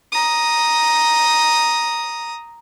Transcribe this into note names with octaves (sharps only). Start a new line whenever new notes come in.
A#5 D#6